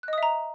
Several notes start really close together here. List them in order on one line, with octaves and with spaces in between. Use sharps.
F#6 D#5 D#6 E5 A#5